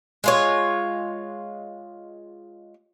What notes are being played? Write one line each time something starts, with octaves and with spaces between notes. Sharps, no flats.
G#3 F4 C#5